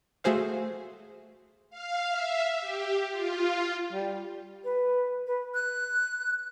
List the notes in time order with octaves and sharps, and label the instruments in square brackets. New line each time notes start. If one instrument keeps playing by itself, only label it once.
[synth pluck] A3 F#4 G#4 C5 F5
[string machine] F5
E5
G4
F4
[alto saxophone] G3
[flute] B4
B4
F#6